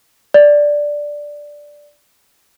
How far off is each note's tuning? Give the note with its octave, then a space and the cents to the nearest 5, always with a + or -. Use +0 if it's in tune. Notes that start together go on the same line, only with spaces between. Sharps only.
D5 +0